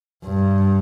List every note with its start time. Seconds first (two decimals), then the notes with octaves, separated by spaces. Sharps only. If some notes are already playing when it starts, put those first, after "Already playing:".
0.26 G2